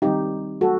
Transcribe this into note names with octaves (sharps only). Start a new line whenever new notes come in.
D#3 G3 C4 D#4 G4
F#3 A3 F#4 A4